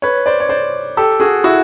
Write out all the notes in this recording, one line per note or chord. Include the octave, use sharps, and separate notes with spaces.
B4 C#5
C5 D5
C#5
C5 D5
G4 A4
F#4 G#4
E4 F#4